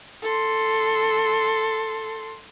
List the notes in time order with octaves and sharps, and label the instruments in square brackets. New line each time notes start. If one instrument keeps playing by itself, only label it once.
[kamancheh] A4 C6